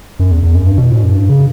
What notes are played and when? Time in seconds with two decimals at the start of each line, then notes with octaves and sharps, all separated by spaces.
0.20 F#2
0.31 E2
0.43 E2
0.55 F#2
0.66 G2
0.78 B2
0.90 A2
1.02 F#2
1.14 G2
1.29 C#3